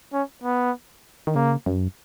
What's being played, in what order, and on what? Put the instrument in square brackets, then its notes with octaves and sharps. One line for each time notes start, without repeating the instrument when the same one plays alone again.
[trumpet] C#4
B3
[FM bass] D#3
[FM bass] C#3 [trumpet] A#3
[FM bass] F#2